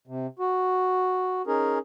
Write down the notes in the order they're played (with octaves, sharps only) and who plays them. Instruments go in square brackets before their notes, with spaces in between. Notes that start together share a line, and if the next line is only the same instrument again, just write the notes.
[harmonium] C3
F#4
C#4 D#4 G#4 A#4